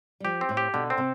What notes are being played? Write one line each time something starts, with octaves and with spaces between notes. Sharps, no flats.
G3
F3 G4
C4
A2
G4
B2 D3
C4
C3